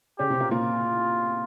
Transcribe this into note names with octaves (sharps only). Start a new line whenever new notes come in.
C#3 C#4 G4
C3 C4
A#2 A#3
A#2 A#3 F4